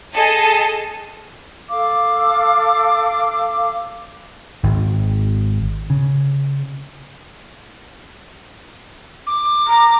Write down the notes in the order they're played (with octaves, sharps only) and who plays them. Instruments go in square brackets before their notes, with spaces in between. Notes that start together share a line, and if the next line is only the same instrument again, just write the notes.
[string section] G#4 A4 D#5 A5
[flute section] A4 F5 D6
[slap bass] G#1
C#3
[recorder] D6
[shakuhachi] A#5